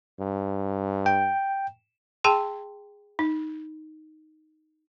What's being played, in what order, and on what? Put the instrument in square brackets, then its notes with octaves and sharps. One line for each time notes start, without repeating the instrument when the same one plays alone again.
[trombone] G2
[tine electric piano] G5
[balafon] G#4 G5 A5 C6
D#4